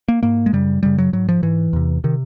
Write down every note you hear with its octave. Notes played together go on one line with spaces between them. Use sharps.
A#3
G#2 A#3
G#3
F#2 C#3 G3
F#2 C#3 G3
F#3
G#2 F#3
F3
G#2 E3
E2 C3
C3 D#3